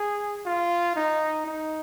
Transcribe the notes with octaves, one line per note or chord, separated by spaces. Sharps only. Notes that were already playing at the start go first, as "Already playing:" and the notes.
Already playing: G#4
F4
D#4
D#4